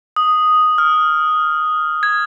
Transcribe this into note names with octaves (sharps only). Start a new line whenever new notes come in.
D#6
F6
G#6